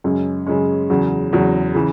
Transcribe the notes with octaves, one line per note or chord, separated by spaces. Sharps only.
F#2 C#3 G#3 C#4
F#2 C#3 G#3 C#4
E2 C#3 F#3
E2 C#3 F#3
C#3 E3